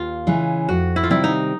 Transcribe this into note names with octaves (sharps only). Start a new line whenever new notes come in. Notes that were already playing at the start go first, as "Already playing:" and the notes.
Already playing: D#2 F4
C#3 E3 G#3 C#4
F2 F#4
E4
F4
C3 D#3 G3 C4 E4
D#4